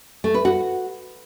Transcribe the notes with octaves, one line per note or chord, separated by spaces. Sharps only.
A3
B4
F#4